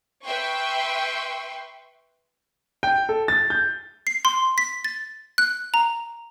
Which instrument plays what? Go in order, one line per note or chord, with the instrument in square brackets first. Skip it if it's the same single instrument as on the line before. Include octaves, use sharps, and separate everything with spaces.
[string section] B4 E5 G5 C6 C#6
[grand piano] G5
A4
A6
G6
[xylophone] C7
C6
B6
A6
F#6
A#5